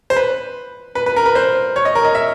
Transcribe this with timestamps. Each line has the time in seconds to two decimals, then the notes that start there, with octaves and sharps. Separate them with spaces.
0.10 C5
0.16 B4
0.95 B4
1.06 B4
1.16 A#4
1.26 B4
1.35 C5
1.76 C#5
1.85 D#5
1.95 A#4
2.05 D#5
2.15 E5